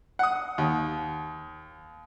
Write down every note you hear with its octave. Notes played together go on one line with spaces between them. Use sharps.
F#5 D#6
D#2